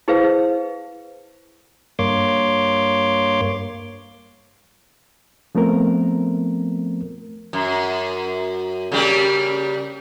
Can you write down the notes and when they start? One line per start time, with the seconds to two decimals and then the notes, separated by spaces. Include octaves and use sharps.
0.08 E4 G#4 B4 C5 F5
1.99 G2 A#3 C#5 C6 D6
5.55 F3 A3 B3 C4 A#4
7.53 F#2
8.92 C#3 G3 A#3